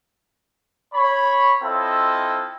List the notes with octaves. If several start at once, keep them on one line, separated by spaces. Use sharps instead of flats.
C#5 B5
C4 E4 F4 A4 D#5